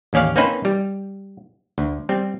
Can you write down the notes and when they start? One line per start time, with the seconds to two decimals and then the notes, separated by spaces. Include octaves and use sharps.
0.13 A1 D#2 C#4 D5 F5
0.36 A#3 C4 C#4 D#4 B4 C5
0.65 G3
1.78 D2
2.09 G3 C4